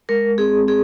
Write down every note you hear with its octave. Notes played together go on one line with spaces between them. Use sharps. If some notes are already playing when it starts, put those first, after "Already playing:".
G#3 A#4
C4 G#4
C4 G#4